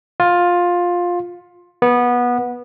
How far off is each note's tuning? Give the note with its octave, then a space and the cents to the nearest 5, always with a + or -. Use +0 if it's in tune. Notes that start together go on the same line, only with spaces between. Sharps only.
F4 +15
B3 -15